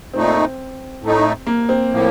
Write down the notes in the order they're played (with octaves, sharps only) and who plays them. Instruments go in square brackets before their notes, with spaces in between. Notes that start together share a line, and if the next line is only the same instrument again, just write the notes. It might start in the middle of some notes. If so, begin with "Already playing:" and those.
[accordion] A#2 A3 D#4 [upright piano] C4
[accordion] A2 A3 D#4
[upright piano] A#3
C4
[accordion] A2 F3 A#3